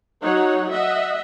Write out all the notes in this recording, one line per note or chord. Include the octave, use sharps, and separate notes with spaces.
F#3 D#4 C#5 F#5
D#5 E5 F#5